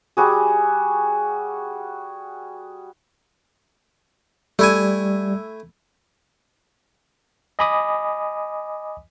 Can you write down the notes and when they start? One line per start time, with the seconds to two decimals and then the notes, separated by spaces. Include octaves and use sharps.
0.17 G3 F#4 G#4
4.59 G3 A3 E4 G#5
7.59 D#5 G#5 B5 D6 D#6